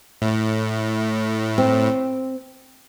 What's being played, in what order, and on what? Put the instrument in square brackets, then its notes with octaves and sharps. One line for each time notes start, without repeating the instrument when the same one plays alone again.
[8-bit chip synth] A2
[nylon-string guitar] C4